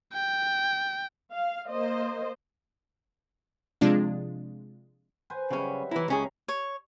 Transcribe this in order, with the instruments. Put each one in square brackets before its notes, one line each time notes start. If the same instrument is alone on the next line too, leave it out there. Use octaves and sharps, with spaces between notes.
[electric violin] G5
[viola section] F5
A#3 C5 D#5
[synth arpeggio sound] C3 F3 G#3 D4 F4
[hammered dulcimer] B4 C5 G#5
[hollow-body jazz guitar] C#3 C#4 [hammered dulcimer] F#3 G3 E5
[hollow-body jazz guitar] E3 E4 [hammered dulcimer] A#5
[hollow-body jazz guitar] C#2 C#4 G#4
[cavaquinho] C#5